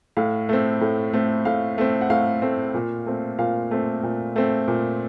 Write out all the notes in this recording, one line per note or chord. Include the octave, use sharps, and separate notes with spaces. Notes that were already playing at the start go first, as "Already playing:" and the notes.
A2 F5
A3 C4
A2
A3 C4
A2 F5
A3 C4
F#5
A2 F5
A3 C4
A#2
A3 C4
A#2 F5
A3 C4
A#2
A3 C4
A#2